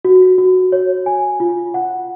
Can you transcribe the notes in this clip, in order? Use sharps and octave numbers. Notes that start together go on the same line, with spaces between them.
F#4
F#4
C#5
G#5
F4
F#5